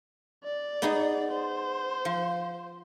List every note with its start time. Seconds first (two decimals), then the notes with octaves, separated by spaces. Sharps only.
0.44 D5
0.82 B3 D#4 G#4
1.31 C5
2.05 F3